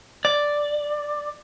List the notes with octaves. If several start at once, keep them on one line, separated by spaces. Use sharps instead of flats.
D5